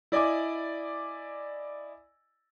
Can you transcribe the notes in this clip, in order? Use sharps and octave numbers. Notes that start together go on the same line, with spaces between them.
E4 D5 D#5 G#5 D6